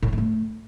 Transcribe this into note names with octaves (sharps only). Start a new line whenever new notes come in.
A2
D3
G#3
A3